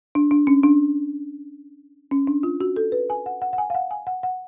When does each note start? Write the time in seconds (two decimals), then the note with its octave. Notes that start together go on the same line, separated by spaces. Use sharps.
0.15 D4
0.31 D4
0.47 C#4
0.63 D4
2.11 C#4
2.27 D4
2.43 F4
2.61 F#4
2.76 A4
2.92 B4
3.10 G#5
3.26 F#5
3.42 F#5
3.53 F#5
3.58 G#5
3.70 F5
3.75 F#5
3.91 G#5
4.07 F#5
4.23 F#5